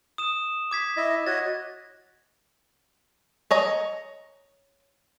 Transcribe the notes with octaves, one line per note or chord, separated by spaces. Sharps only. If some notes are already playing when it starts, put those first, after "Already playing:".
D#6 E7
D6 G#6 B6
E4 D#5
F#4 C#5 D#5 A6
C#5 D#5 A#5